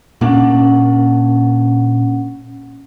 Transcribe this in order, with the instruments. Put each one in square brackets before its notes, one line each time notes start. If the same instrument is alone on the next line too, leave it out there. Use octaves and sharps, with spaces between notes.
[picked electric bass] A#2 A#3 D4 [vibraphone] C#4 F#5